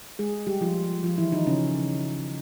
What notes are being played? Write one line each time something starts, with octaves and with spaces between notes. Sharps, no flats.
G#3 G#4
G3 G4
F3 F4
F3 F4
E3 E4
D#3 D#4
C#3 C#4